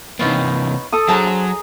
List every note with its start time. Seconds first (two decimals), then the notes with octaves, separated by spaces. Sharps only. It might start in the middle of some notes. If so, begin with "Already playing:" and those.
0.19 C3 E3 A#3 B3 C#4 D#4
0.92 A4 A5 D#6
1.08 F#3 D4 G#4 C5 A5 A#5
1.27 C6